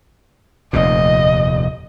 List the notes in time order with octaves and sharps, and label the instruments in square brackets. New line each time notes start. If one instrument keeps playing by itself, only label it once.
[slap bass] F1 D#2 A#2 [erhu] D#5